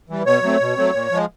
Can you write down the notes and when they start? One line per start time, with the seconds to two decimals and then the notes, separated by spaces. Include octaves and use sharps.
0.10 E3 G3
0.25 B2 C#5
0.42 F#3 A3 C4
0.60 B2
0.77 F#3 A3 C4
0.94 A#2
1.12 F3 G#3